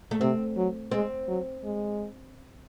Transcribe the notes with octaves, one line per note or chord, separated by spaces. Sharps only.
A3
C3 C4
F#3
G#3 C4
F#3
G#3